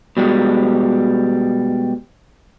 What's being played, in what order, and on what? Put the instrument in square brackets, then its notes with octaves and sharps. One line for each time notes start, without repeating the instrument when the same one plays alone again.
[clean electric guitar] B2 G3 G#3